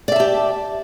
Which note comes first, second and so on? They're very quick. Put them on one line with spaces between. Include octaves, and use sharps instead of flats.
D5 E5 A5 G4